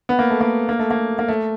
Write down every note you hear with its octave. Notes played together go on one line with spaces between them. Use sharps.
B3
A#3
A3
A#3
A#3
A3
A#3
A#3
A3